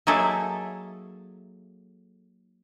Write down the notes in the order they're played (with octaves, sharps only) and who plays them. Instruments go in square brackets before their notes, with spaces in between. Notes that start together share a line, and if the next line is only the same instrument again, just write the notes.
[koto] F#3 A#3 D#4 G#4 A4 E5